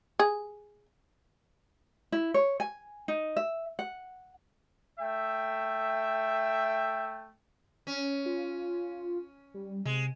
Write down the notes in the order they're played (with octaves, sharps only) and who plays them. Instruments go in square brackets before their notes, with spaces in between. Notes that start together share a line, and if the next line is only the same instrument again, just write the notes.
[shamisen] G#4
[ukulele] E4
C#5
G#5
D#4
E5
F#5
[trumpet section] A3 E5 G5
[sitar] C#4
[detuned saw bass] F4
G3
[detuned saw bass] C3 [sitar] G#3